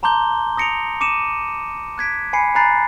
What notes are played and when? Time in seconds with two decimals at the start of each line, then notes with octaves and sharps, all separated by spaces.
0.03 A5 A#5 C6 D6 G6 G7
0.57 D#6 A#6 C#7 D7 F7
1.01 D6 C#7 D#7 E7
1.98 F#6 G#6 B6 D7
2.33 G#5 B5 C7 C#7
2.55 G#5 A#5 B5 F#6 A6 C7